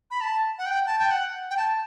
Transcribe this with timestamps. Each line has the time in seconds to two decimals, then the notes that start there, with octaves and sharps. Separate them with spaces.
0.11 B5
0.21 A5
0.58 F#5
0.66 G5
0.86 A5
0.99 G5
1.11 F#5
1.50 G5
1.57 A5